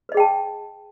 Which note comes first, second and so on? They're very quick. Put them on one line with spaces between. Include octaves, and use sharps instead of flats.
B4 D#5 G#4 G5 A5